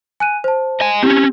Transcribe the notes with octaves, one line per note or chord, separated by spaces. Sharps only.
G#5 F#6 D#7
C5 A5
D#5 G#5
C4 C#4 E4 G4